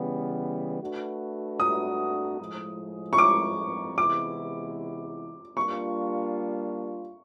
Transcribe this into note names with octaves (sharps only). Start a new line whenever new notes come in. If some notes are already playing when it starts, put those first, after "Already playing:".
Already playing: C#3 E3 G3 B3
A3 D4 F#4 B4
D#6
A2 F3 G#3
C#6
D6
C3 E3 G#3 B3 E4 D6
G3 A#3 D4 F4 C#6